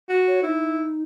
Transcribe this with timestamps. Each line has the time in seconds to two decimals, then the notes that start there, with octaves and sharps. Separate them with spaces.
0.09 F#4
0.28 C#5
0.43 D#4 E4